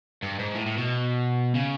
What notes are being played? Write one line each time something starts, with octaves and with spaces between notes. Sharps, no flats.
G2
G#2
A2
A2
B2
C#3